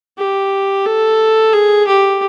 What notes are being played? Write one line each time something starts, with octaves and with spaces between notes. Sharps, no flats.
G4
A4
G#4
G4